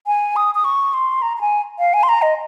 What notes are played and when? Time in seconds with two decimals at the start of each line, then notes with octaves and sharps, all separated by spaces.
0.07 G#5
0.36 D#6
0.55 D#6
0.64 C#6
0.93 C6
1.22 A#5
1.37 A#5
1.41 G#5
1.79 F5
1.94 G#5
2.03 C6
2.09 A#5
2.22 D#5